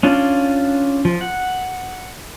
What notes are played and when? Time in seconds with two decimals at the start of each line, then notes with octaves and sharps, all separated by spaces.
0.03 C#4 D4 F4
1.05 F3
1.21 F#5